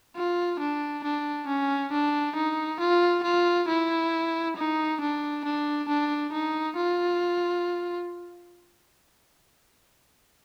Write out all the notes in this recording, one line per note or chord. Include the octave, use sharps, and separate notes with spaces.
F4
D4
D4
C#4
D4
D#4
F4
F4
E4
D#4
D4
D4
D4
D#4
F4